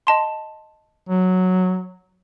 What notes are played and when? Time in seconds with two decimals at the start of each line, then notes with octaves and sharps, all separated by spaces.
0.07 D#5 A5 C6
1.09 F#3